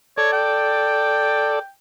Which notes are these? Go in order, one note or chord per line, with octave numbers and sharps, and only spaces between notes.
A4 C#5 D5
G5